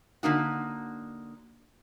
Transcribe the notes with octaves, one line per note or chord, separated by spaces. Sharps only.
D3 A#3 D#4 F#4